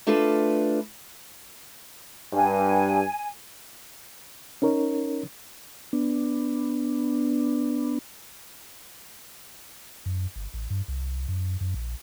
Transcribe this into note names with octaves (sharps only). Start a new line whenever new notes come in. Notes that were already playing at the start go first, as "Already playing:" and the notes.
A3 D4 F4 A4 B4
G2 G#5
C#4 D#4 A#4 C#5
B3 D4
F#2
G1
A1
G2
C2
F#2
F#2
A#1